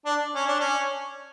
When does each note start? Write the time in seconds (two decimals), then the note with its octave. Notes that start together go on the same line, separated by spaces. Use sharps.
0.05 D4
0.35 C#4
0.47 D4
0.60 C#4